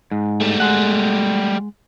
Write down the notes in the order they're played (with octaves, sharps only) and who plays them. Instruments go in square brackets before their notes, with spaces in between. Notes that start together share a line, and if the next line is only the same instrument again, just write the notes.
[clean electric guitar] G#2
[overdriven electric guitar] G3 A3
[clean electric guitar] G#3 F#5